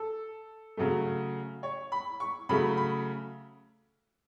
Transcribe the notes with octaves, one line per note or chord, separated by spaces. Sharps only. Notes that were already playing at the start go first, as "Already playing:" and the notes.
Already playing: A4
C#3 F#3 A3
C#5
B5
C#6
C#3 F#3 A3 B5
B5